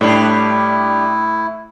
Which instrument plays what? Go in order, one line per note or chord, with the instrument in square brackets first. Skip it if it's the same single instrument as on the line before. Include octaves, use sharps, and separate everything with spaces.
[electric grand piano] A2 [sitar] G3 D4 [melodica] E4